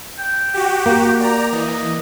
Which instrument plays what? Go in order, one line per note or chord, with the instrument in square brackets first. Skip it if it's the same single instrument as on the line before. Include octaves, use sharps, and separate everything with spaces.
[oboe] G5
[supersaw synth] F#4 G4
[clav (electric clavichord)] A#3
[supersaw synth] D5 A#5
[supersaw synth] E3 [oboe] D#5